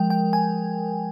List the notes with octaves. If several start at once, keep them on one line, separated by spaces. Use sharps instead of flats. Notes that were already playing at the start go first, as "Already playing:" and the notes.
Already playing: F3 G#3 A#4 G5
G5
G#5